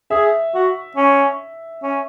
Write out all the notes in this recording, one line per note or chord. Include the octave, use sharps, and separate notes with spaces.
G#4 E5
F#4
C#4
C#4